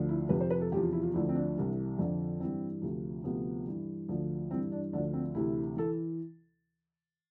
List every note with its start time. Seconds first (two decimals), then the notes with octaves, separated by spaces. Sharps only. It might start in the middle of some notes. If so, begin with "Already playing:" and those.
Already playing: D2 D3 F3
0.09 E4
0.29 F2 C3 F3 B4
0.40 C5
0.50 B4
0.61 A4
0.72 E2 C3 F3 G4
0.83 F4
0.93 E4
1.03 F4
1.13 D2 D3 F3 E4
1.29 C4
1.35 D4
1.56 C2 C3 E3
1.99 F2 D3 F3
2.40 G2 E3 C4
2.82 D2 C3 F3
3.24 D2 C3 F3 B3
3.66 G2 E3
4.08 D2 D3 F3
4.50 G2 E3 C4
4.72 D4
4.93 D2 D3 F3 D4
5.13 C4
5.35 D2 C3 E3 E4
5.76 E3 A4